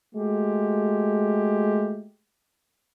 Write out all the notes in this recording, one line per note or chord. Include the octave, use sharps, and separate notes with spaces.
G#3 A3 F#4 G4